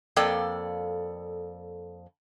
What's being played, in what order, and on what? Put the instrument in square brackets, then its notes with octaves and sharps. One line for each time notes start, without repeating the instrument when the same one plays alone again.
[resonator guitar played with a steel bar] F2 A#3 A4 D5 G5